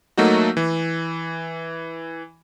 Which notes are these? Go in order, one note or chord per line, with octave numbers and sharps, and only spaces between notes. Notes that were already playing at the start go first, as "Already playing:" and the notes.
F#3 A3 A#3 D#4 F#4
E3